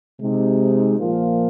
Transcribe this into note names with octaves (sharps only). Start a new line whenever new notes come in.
C3 G#3 D#4
A#2 F3 A#3 F4